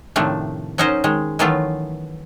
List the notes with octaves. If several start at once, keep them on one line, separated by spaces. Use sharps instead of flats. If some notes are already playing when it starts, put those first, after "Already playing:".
A2 C3 D#3 F3 A3 D4
F#3 C#4 D#4 A#4 C5
D#3 G#3
D#3 E3 F#3 A3 B3 F4